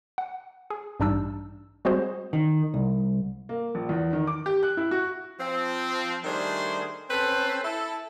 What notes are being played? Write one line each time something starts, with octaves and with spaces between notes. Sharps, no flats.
F#5
G#4
A1 G2 G3 D4 D#4 E6
G3 G#3 C4 F#4 G#4 C5
D#3
C2
A#3
A#1
E2
D#3
D6
G4
F#6
E4
F#4
F3 C4
D#3 G3 A3 D4 G#4 C5
C4 C#4 A4 B4 C5
E4 A4